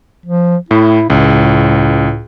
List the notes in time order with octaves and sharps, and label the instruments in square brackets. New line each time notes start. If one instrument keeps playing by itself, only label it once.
[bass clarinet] F3
[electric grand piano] A2 [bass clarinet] E4
[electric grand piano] C#2 [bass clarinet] A2